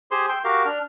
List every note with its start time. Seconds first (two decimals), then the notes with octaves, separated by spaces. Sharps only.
0.11 G4 G#4 C5 C6
0.29 G5 C6 E6
0.44 F#4 G4 A#4 F5
0.65 D4 F6